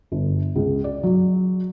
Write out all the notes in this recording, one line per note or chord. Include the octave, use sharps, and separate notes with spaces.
G1
C#2
D5
F#3